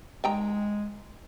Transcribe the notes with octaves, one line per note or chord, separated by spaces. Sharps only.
D#3 G#3 G5 A#5